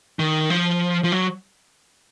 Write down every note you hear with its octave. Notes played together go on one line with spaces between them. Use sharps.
D#3
F3
F3
F#3